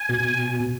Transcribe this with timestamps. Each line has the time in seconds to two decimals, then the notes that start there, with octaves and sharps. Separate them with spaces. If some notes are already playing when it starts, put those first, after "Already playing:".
Already playing: G#5
0.09 B2